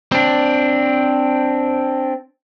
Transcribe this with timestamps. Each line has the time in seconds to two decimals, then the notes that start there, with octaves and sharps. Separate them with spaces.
0.12 C4 D4